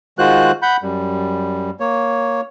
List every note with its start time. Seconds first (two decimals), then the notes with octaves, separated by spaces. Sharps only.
0.18 D#3 G#3 F4 F#4 C5 F#6
0.62 F#5 B5 G6
0.82 F#2 G3
1.80 A#3 C#5